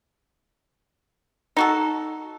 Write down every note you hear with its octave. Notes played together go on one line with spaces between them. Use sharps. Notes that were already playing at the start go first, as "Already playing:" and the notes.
D#4 F#4 A4